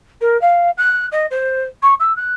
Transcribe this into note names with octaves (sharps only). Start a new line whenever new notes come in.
A#4
F5
F#6
D#5
C5
C#6
E6
F#6